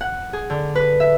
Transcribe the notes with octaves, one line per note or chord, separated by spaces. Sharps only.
F#5
G#4
D3
B4
E5